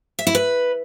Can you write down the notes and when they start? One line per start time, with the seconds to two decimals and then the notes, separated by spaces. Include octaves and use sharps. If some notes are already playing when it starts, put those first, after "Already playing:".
0.19 E5
0.27 E4
0.35 B4